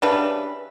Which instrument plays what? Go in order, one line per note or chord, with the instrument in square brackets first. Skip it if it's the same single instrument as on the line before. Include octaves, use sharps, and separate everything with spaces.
[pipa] C#3 E3 G3 D4 B4